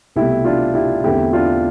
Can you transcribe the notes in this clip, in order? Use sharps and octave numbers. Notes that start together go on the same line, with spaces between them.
C2 B2 A3 E4 G4
D4 F4
E4 G4
E2 D3 A3 C4 E4 G4
D4 F4